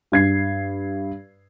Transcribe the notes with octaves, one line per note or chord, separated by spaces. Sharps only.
G2 G#6 C7